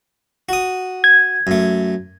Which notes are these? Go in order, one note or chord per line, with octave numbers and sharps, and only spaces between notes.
F#4 D#6
G#6
F#2 A3